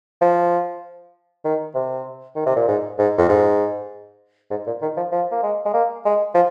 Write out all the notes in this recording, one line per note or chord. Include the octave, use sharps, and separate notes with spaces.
F3
D#3
C3
D#3
C3
A#2
G#2
G#2
F2
G#2
G#2
A#2
D#3
F3
F3
A#3
G#3
G#3
A#3
G#3
F3